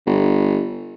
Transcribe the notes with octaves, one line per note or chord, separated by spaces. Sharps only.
G1